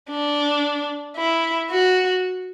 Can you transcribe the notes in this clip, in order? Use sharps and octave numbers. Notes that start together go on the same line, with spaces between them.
D4
E4
F#4